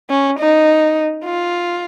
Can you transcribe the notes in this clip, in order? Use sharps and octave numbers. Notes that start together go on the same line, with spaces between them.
C#4
D#4
F4